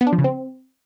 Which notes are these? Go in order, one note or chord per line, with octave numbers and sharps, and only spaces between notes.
B3
D4
F3
C#3
C4